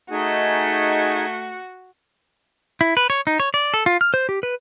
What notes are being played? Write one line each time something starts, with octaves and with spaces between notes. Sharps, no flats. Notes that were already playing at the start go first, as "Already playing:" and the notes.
A3 D#4 F#4 G#4 G#5
E4
B4
C#5
D#4
C#5
D5
A4
F4
F6
C5
G4
B4